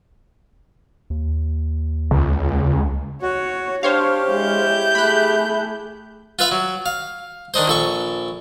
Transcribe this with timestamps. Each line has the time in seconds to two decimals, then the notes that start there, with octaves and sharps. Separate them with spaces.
1.10 D#2
2.11 C#2
3.22 F#4 C#5
3.83 D4 G4 C5 C#5 F5
4.31 G#3 E4 G6
4.95 A3 G#4 B5 F#6
6.39 F4 B4 E5 F5
6.51 F#3
6.86 F5
7.54 D#3 D4 D#4 C5
7.67 A#1 A4 C#6